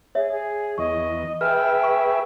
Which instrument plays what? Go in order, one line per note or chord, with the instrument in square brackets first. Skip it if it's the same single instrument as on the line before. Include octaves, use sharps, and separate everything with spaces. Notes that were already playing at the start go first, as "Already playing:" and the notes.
[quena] G#4 [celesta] C#5 E5
[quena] G#4
[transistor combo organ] E2 [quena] D#5 [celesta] C#6
[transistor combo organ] G#4 B4 E5 [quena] G5 [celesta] F6
[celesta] C#6